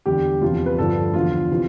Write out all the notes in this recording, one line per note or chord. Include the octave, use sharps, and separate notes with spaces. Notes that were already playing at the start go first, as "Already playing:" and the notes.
E2 D3 G3 G4
E2 C3 F3 F4
B4
G2 D3 F3 A4
E2 D3 F3 F4
C3 E3